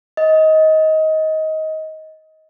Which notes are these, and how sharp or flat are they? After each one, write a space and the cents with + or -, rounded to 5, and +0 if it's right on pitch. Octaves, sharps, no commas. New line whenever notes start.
D#5 +20